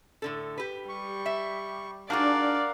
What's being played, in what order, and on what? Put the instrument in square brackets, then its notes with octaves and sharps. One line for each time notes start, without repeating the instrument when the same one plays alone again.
[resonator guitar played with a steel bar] A2 D3 A4
G4 B4
[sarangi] G3 [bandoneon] C#6
[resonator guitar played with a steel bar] E5
[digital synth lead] D4 [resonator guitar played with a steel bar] D#4 F#4 G#4 [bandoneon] A#4 F5 F#5 [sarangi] D5